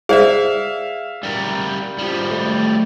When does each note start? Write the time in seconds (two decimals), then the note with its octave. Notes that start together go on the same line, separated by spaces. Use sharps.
0.09 G#4 C5 D5 E5 F5
1.23 G3 A#4
1.99 F3 G3
2.31 A3